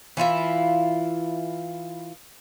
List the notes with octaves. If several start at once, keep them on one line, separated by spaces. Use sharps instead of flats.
E3 E4 F4 E5